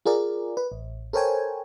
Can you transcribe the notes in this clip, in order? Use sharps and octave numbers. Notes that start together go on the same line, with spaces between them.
F4 G#4 A#4 D5
B4
A1
A4 A#4 C5 C#5 G5 G#5